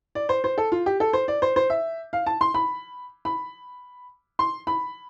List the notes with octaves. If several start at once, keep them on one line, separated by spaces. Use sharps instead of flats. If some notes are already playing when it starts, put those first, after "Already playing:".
D5
C5
C5
A4
F4
G4
A4
C5
D5
C5
C5
E5
F5
A5
C6
B5
B5
C6
B5